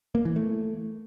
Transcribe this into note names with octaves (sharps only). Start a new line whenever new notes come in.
A#3
E3
A3